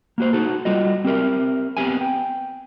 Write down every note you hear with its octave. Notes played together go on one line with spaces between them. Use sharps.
A#3 F#4 C5
D#4 F#4 A4
G3 F4 F#4 D#5
C4 G4 A#4 E5
B3 C4 G4 E5 G#5
G5